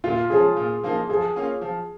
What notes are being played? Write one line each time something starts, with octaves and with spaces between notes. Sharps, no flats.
A#2 F4
F3 G#3 C#4 G#4
A#2
F3 A#3 D#4
F3 G#4
A#3 C#4 F4
F3